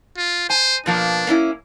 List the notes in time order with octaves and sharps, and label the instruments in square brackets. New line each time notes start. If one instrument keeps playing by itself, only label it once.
[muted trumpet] F4
[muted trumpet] C5 [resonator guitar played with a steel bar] G#5
[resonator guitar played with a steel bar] B2 F3 A#3 [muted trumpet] D4
[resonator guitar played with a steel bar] A#3 C#4 E4